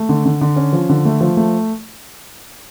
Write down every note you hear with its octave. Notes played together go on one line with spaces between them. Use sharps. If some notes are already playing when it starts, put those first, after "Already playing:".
Already playing: A3
D3
D3
D3
C#4
F3
D3
A3
F3
A3